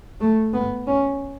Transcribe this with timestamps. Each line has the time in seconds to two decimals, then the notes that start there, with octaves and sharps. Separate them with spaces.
0.21 A3
0.54 B3
0.87 C#4